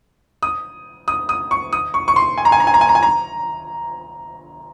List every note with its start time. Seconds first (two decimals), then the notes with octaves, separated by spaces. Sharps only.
0.43 D#6
1.08 D#6
1.29 D#6
1.51 C#6
1.73 D#6
1.94 C#6
2.08 C#6
2.16 C6
2.38 G#5
2.45 A#5
2.52 G#5
2.60 A#5
2.67 G#5
2.74 A#5
2.81 G#5
2.89 A#5
2.95 G#5
3.03 A#5